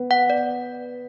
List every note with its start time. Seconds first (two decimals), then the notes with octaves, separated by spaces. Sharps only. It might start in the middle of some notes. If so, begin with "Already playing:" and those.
Already playing: B3
0.11 F#5
0.30 D5